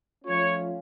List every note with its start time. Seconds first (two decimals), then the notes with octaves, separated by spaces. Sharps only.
0.25 F3 A3 C#4 F4 C#5